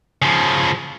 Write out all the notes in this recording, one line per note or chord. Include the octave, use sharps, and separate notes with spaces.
C#3 F3